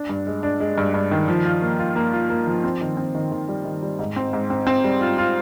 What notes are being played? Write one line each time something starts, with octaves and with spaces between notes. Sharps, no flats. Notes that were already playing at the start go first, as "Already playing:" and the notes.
Already playing: D4
G2
G#3
D4
G#3
G2
G2
D#3
F3
F4
A#3
F4
A#3
F4
A#3
F3
C4
D#3
C4
D#3
D#3
G3
D#3
G3
G#2
C4
G#2
C4
C4
G3
F4
F4